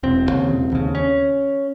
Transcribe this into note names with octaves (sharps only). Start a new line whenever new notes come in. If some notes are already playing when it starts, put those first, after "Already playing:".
E1 C4
D#2 C#3
E1
D#2 C#3
C#4